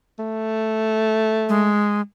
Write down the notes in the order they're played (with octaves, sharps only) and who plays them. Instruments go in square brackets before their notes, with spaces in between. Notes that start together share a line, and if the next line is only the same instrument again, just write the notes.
[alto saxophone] A3
[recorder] G#3